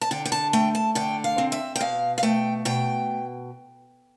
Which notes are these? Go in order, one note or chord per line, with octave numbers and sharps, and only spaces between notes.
A5
D3 G5
G5
A5
A3 G5
A5
D3 G5
F5
C4
E5
G5
B2 F5
F5
A3 G5
B2 G5